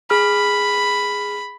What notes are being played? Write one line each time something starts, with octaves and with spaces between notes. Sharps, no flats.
G#4 B5 F6